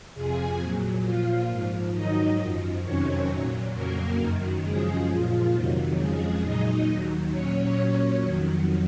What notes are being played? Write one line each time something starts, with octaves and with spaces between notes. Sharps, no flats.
F2 C3 F3 G#4 G#5
A#2 F#3
A#2 F3 F4 F5
G#2 F3
G#2 D#3 F#3 D#4 D#5
F#2 F3
F2 C3 D#3 F#3 C#4 C#5
A#2 F#3
F2 C#3 F#3 A#3 A#4
F#2 D#3 F#3
F#2 C#3 F3 G#3 G#4
A#2 F3 F4
F2 C3 D#3 F#3
F2 C#3 F3 G#3 G#4
A#2 F#3 D#4 D#5
D#2 D#3 F#3
A#2 F#3 C#4 C#5
A#2 F#3 C#4 C#5
F2 D#3 F#3